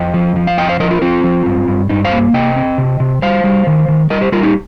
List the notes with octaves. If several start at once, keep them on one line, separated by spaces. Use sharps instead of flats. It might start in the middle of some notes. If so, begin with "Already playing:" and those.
Already playing: F2 D#5 G5
F3
F3
F5
F2 D#5 G5
C5 F5
F3 A#4 D#5
F4 A#4
F3 C4 F4
F3
G2
G2
G2 D#4
C5 F5
A#3
C3 D#5 G5
C4
C3
C3
G3 C5 F5
G3
D#3
D#3
G3 A#4 D#5
G4 C5
G3 F4 A#4
D#4 G4